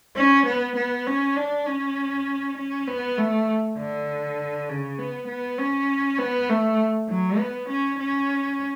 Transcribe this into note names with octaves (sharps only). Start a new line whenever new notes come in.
C#4
B3
B3
C#4
D4
C#4
C#4
B3
A3
D3
C#3
B3
B3
C#4
B3
A3
F#3
B3
C#4
C#4